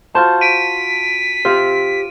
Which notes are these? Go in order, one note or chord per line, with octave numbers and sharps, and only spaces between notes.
F4 F#4 C5 A5
B6 D7 D#7
F4 G4 C5